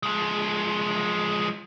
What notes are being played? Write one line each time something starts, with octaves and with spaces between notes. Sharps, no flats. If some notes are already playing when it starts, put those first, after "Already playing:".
F3 G#3